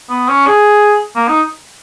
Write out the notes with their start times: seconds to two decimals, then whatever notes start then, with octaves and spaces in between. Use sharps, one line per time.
0.10 B3
0.29 C#4
0.47 G#4
1.16 A#3
1.28 D#4